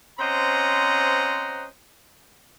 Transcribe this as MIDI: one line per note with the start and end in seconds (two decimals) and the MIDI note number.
0.19 1.66 60
0.19 1.66 61
0.19 1.66 72
0.19 1.66 75
0.19 1.66 78
0.19 1.66 82